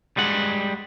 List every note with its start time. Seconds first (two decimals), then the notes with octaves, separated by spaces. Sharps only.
0.17 G3 G#3 F#5